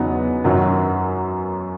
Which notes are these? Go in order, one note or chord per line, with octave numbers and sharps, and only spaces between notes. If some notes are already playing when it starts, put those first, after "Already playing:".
Already playing: E2 C#3 F#3 B3 D#4
F#2 D#3 F#3 C#4 F#4